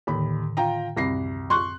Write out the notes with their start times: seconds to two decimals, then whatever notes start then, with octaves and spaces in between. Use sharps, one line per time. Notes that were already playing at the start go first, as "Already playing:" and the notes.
0.07 D#2 A2 D3 D#3 B5
0.57 F4 G5 A#5
0.96 C2 F#2 C4 B5 A#6 C7
1.50 C6 C#6 F#6